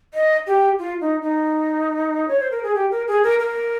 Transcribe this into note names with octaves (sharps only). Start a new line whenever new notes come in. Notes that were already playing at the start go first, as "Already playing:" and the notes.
D#5
G4
F4
D#4
D#4
C#5
C5
A#4
G#4
G4
A#4
G#4
A#4
A#4